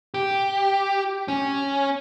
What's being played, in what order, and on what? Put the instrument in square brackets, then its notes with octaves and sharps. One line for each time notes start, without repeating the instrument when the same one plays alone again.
[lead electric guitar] G4
C#4